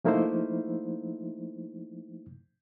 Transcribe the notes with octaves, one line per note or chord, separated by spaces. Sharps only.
F3 A3 A#3 D#4 E4 C5